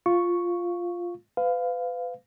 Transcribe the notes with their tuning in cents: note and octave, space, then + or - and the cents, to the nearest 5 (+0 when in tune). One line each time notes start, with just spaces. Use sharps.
F4 +0 F5 +0 C#6 +0
B4 +35 F5 +0